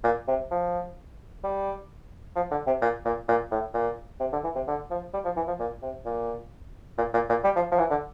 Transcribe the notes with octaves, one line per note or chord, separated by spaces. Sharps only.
A#2
C3
F3
G3
F3
D3
C3
A#2
A#2
A#2
A2
A#2
C3
D3
E3
C3
D3
F3
G3
F3
E3
F3
A#2
C3
A#2
A#2
A#2
A#2
G3
F3
F3
E3
D3